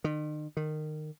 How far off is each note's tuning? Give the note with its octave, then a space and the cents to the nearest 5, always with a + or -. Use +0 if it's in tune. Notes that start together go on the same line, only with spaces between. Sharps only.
D#3 -40
D#3 -20